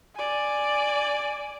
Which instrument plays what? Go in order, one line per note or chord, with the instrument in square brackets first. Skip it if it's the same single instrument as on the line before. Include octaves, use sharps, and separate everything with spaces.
[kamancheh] D5 G#5